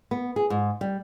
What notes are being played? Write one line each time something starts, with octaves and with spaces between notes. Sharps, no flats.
B3
G#4
G#2
G3